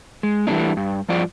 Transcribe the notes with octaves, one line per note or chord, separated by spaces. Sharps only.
G#3
E3 G3 A3 A#3 D4 D#4
G2
G2 F3 F4 D5